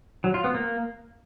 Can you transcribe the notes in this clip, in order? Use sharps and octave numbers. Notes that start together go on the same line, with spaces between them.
F#3
F4
B3
A#3